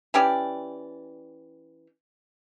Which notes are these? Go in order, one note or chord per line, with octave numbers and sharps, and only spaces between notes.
E3 C#4 G4 D5